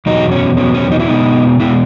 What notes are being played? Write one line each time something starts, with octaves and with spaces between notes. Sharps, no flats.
E2 B2 F#3 B3 D#4
C#4
E2 B2 F#3 B3 C#4
C#4
D#4
E4
B2 G#3 B3 D#4
B2 G#3 B3 E4